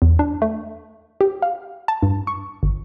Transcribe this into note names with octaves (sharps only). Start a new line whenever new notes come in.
E2
D4
A3
G4
F5
A5
G2
C#6
G1